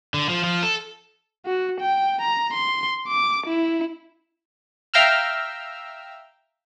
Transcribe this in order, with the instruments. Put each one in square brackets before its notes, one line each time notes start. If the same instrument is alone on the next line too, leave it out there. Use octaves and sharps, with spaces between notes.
[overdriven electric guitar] D3
F3
F3
A4
[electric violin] F#4
G5
A#5
C6
D6
E4
[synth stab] E5 F5 G5 A#5 E6 F6